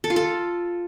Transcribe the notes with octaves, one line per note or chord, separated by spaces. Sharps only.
A4
F4
A4